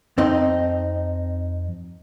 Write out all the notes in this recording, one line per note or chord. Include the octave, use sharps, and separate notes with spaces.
F2 C4 D#4